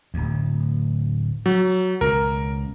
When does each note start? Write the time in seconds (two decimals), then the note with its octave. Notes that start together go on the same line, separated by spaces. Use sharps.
0.14 D1 D2
1.46 F#3
2.01 C#2 B2 A#4